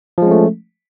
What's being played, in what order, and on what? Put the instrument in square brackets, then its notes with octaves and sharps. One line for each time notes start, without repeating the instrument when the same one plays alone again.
[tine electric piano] F3
G#3
C#4
A3